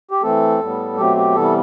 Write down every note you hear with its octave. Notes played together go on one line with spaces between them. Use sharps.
G4
E3 A3 C4 A4
A2 G3 B3
B2 F#3 A3 C4 G4
G4
C3 E3 G3 B3 A4